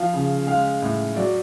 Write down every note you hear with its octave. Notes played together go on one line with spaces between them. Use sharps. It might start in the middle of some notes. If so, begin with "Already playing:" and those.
Already playing: F3 F5
C#3
G#3 F5
A2
F#3 D5